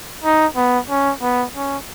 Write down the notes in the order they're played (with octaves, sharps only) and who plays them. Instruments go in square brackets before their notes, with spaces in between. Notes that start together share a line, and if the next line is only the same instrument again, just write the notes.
[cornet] D#4
B3
C#4
B3
C#4